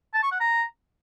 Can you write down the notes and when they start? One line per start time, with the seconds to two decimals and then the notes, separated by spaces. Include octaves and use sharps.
0.14 A5
0.23 C#6
0.32 F#5
0.40 A#5